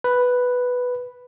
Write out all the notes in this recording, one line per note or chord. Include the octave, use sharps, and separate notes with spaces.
B4